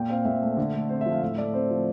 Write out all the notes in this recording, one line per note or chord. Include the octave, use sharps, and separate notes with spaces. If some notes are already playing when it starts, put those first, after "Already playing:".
Already playing: A#2 G5
C4 F5
A#2 E5
A3
D3
A3
C4 C5
E5
F3
F5
A2 E5
A3 D5
C4 C5
F3